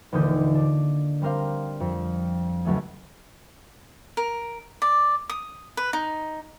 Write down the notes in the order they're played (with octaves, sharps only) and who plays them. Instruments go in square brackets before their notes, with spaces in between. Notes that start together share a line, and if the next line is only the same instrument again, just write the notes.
[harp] D#1 D#2 D3 E3 D#6 G6
D4
G3 C4 A#4 C5 F5
F2
C#2 F#3 A3 G#4
[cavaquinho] A#4
D5
D#6
B4
D#4